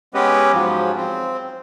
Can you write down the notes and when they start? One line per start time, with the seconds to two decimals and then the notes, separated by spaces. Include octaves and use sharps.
0.14 G#3 B3 C#4 G4 B4 D#5
0.53 G#2 F3 F#3
0.96 C4